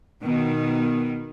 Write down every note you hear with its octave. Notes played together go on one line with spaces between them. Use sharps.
B2 D#3